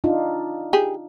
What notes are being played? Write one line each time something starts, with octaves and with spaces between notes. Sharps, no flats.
D4 D#4 F4
G4 G#4